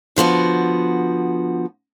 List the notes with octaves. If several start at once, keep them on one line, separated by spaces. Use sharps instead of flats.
D3 F3 B3 F#4